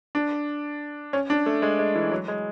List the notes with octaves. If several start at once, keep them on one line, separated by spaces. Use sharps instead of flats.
D4
C#4
D4
A3
G#3
G#3
E3
F#3
G#3